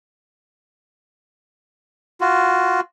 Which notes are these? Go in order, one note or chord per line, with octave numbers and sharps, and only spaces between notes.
F4 F#4